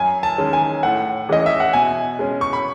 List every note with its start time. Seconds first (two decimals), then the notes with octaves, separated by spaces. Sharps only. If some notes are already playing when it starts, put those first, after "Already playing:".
Already playing: F#2 G#5
0.23 A5
0.38 D#3 G#3 C#4
0.53 G#5
0.83 A2 F#5
1.29 E3 G#3 C#4 D#5
1.46 E5
1.60 F#5
1.73 B2 G#5
2.19 G#3 C#4
2.41 C#6
2.53 B5